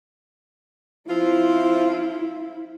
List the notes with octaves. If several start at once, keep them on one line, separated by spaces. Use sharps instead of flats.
F3 C4 E4 F4